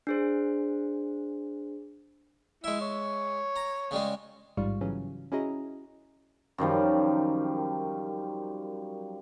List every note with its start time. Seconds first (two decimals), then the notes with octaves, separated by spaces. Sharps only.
0.07 D4 G#4 C5
2.64 G#3 E4 E5
2.81 C#5
3.56 A#5
3.91 C#3 G3 G#3
4.57 A1 G#2 G3 F4 F5 C#6
4.81 C#3 E3 F#3 C#4
5.32 C#4 E4 F#4 G#4 D#5 A#5
6.58 F#2 D#3 F3 G3